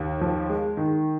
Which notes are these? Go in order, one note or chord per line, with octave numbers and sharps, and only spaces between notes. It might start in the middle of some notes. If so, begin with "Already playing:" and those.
Already playing: D#2
F3
G#3
D#3